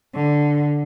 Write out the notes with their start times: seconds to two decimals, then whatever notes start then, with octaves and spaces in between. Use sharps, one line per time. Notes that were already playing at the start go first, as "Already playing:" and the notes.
0.15 D3